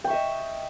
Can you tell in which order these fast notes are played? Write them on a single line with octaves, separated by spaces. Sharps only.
G5 C#6 E5 D#5